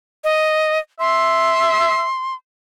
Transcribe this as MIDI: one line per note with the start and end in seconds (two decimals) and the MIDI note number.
0.24 0.78 75
1.00 2.07 76
1.00 2.34 84